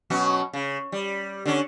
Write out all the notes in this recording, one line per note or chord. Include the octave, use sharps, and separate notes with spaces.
B2 F#3 C#4
C#3
G3
D3 C#4